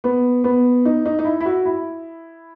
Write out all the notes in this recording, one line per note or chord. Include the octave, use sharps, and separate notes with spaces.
B3
B3
D#4
D#4
D#4
E4
E4
F#4
E4